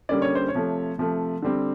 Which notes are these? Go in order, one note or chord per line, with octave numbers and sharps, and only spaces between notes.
D3 G3 A#3 C#4 D5
C#5
C5
C#5
C3 F3 A3
C3 F3 A3
D3 G3 C4